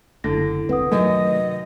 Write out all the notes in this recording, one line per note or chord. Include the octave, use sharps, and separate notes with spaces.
F#1 D3 E4 A#6
E1 C2 C4 B4 F#5 D#6
F#2 C3 D#3 A3 D#5